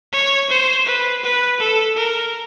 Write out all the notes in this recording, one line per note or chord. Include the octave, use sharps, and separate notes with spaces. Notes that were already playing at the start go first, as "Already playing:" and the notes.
C#5
C5
B4
B4
A4
A#4